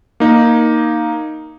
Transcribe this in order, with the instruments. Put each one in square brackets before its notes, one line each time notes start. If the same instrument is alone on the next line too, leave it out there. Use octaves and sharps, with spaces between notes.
[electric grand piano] A#3 D#4